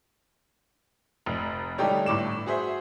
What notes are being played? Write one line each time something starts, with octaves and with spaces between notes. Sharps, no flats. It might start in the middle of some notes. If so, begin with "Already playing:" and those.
F1
D3 G3 A3 D#4 G4 C#5
G1 A2 D6 E7
F#4 G#4 C5 E5